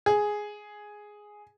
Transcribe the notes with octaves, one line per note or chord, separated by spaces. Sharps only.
G#4